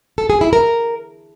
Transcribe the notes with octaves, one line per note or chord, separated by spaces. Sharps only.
A4
G#4
E4
A#4